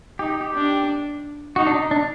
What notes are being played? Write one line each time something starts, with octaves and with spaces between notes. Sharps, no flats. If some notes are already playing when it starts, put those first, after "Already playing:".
D#4 G4
G4
D4
D#4 F#4
D4
D#4
D4